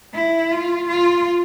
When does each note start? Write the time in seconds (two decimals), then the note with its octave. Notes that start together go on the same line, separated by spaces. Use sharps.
0.14 E4
0.51 F4
0.88 F4